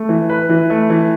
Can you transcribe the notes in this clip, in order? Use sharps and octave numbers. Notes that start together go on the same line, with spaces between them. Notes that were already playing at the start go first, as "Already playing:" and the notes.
Already playing: A3
E3
B4
E3
A3
E3